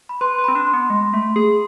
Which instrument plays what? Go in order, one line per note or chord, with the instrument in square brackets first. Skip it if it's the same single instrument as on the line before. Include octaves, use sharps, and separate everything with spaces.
[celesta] B5
[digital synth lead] B4 [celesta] C6
[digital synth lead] B4
[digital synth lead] C4 [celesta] B5
[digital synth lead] D4
[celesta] C6
[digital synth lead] B3
G#3
A3
G#4